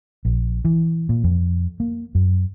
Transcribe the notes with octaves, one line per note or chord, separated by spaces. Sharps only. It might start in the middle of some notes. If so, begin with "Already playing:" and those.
A#1
E3
A#2
F2
A#3
F#2